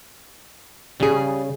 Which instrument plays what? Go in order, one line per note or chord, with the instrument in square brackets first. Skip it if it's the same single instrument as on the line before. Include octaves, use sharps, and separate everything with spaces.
[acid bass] C#3 [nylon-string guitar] G3 G#4